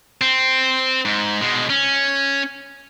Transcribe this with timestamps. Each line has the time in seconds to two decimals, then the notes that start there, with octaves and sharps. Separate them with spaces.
0.21 C4
1.05 G#2
1.41 B2 G#3
1.70 C#4